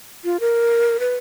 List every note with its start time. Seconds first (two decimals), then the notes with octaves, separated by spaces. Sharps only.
0.24 F4
0.40 A#4
1.00 B4